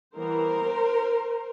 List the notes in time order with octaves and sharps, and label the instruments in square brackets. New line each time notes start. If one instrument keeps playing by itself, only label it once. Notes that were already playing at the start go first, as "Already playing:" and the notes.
[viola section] E3 G3 B3 A#4 C5